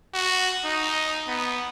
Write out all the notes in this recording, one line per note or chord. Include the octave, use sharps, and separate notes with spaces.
F#4
D#4
B3